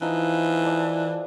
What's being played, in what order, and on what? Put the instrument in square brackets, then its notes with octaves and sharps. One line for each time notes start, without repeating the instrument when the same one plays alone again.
[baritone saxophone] E3 [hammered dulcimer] F3 D#4
[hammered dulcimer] A4 D5